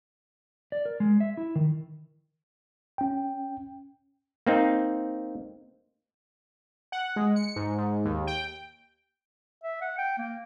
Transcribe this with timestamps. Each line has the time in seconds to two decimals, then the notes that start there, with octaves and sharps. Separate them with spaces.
0.72 D5
0.85 A#4
1.00 G#3
1.20 E5
1.37 E4
1.56 D#3
2.98 C#4 G5
4.47 A#3 C4 D#4
6.92 F#5
7.16 G#3
7.36 C#7
7.56 G#2
7.78 G#2
8.05 D#2
8.27 G5
9.63 E5
9.81 F#5
9.98 G5
10.18 A#3